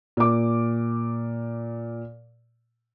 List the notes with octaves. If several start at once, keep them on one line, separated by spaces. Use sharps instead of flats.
A#2 D6